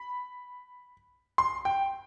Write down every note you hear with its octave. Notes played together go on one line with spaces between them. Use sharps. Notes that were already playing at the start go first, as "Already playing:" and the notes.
Already playing: B5
C6
G5